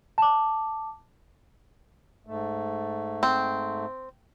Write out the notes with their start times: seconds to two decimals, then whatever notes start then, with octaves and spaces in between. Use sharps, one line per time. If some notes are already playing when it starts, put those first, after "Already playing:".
0.18 A5 D6
2.27 G#2 A3
3.23 C4